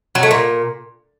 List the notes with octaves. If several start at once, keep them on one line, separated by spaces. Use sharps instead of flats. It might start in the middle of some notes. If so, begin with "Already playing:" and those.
F#3
A3
A#2